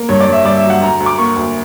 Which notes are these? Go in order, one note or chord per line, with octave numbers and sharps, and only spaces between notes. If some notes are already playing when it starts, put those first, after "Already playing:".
Already playing: A#3
G2 C#5
D5
G2
E5
G2 D5
E5
F#3
F#5
D2 A#5
D2
D6
A#3 C#6
D2